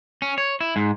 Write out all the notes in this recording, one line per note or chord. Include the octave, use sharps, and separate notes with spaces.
C#4
C#5
E4
G#2